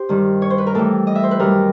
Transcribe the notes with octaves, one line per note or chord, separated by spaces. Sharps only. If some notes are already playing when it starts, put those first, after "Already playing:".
Already playing: G4 C5
G2 D#3 G3
C#5
C5
B4
A#4
A2 E3 G3 A4
D#5
E5
C5
B4
F#2 D#3 G3 A#4